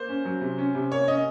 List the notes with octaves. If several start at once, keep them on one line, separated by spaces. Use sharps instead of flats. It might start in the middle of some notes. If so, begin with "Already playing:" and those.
Already playing: A#3 C5
C#4
F#3
C3
C#4
C3
A#3 C#5
C#4 D#5